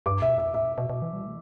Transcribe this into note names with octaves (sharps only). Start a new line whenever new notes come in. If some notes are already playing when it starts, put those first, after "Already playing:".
G2 D6
B2 E5
F2 E5
A2 E5
B2
B2
B2
E3
G3
A3